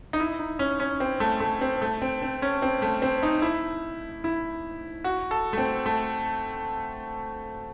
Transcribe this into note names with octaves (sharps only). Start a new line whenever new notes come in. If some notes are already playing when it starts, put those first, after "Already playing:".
D#4
E4
D#4
C#4
C#4
C4
A3
A3
C4
A3
C4
C4
C#4
C4
A3
C4
D#4
E4
E4
F#4
A4
A3
C4
A3